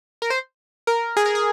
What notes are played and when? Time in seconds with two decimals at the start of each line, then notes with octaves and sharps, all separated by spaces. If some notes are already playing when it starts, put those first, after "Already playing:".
0.22 A#4
0.30 C5
0.87 A#4
1.17 G#4
1.26 A#4
1.35 G#4